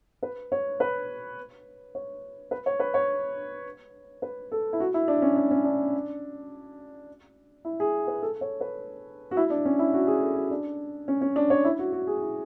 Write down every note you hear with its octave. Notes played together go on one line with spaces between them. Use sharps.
B4
C#5
B4
C#5
B4
C#5
B4
C#5
B4
A4
E4
F#4
E4
D4
C#4
D4
C#4
D4
E4
G#4
B4
A4
C#5
B4
F#4
E4
D4
C#4
E4
F#4
G#4
A4
F#4
D4
C#4
C#4
D4
C#5
E4
F#4
F#4
G#4
E4